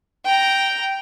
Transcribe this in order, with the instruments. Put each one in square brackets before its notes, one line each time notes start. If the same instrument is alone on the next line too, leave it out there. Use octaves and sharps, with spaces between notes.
[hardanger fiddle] G5 A#5